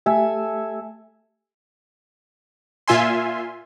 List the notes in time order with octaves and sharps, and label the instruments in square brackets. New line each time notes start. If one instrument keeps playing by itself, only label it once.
[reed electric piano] A3 G4 [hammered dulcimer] A4 E5 G#5
[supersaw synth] A#2 F4 E5 G#5 C6